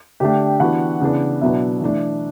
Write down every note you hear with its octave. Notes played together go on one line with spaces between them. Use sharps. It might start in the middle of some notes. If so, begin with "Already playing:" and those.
D3 A3 D4 G4 G5
E3 B3 D4 F#4 F#5
C#3 E3 B3 D4
B2 F#3 B3 D4 E4 E5
E3 A3 D4